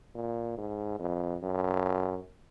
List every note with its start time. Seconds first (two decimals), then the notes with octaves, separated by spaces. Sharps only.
0.15 A#2
0.58 G#2
0.99 F2
1.42 F#2